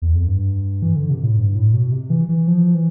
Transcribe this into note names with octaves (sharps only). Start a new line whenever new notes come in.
E2
F2
G2
E3
D3
C3
A2
G2
A2
B2
C3
E3
E3
F3
E3